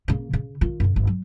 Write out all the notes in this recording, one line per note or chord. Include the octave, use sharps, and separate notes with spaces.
C#3 A#3
C#3
D#3 F4
F#2 C#3
G1
F#3